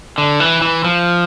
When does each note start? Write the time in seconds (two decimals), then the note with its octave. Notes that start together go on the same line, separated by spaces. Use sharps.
0.18 D3
0.40 E3
0.62 E3
0.84 F3